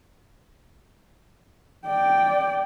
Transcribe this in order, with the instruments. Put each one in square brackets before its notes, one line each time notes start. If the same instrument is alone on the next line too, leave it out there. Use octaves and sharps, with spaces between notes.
[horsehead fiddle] D5 G5